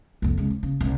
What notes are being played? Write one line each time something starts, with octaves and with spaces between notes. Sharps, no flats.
C2 F2
C#2 G#3
F3
C#3
C2 C#3